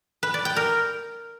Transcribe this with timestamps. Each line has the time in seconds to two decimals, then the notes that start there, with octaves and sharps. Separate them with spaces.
0.23 B4
0.34 D5
0.45 G5
0.56 A#4